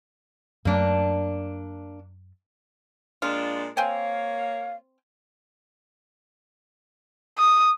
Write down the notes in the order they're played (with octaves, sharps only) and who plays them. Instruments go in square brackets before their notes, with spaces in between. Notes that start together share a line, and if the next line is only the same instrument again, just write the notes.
[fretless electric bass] F#2 F#3 A3 [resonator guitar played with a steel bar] A#3 D4
[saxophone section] A#2 G#3 D4 [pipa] F4
[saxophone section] A#3 C#5 [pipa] C4 G5 G#5 [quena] F5
[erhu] D#6